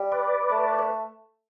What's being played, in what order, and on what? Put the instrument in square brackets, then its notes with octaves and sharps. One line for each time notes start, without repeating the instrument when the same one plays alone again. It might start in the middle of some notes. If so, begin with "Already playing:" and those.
Already playing: [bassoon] G3
[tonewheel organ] B4 D5
[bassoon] A3
[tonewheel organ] B4